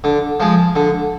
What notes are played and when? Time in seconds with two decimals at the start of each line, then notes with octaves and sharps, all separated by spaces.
0.04 D3
0.40 F3 G#3
0.75 D3